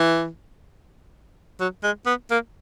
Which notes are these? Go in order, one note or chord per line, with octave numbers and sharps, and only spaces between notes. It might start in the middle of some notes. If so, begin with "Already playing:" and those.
Already playing: E3
F#3
G#3
B3
A#3